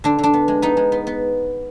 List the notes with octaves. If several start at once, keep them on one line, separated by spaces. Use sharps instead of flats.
D3 D4
D3 D4
B3
G#3
B3 D#4
G#3
B3
B3